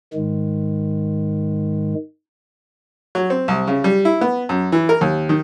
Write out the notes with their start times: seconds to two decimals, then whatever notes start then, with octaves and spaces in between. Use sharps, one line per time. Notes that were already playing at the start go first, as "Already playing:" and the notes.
0.14 G#2 D#3 G#3
3.15 F#3
3.30 C4
3.48 C2
3.68 C#3
3.84 G3
4.05 E4
4.21 B3
4.49 F#2
4.72 E3
4.89 A#4
5.01 D#2
5.29 D#3